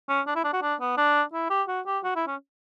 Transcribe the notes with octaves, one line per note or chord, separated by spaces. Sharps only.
C#4
D4
E4
D4
F#4
D4
B3
D4
E4
G4
F#4
G4
F#4
E4
C#4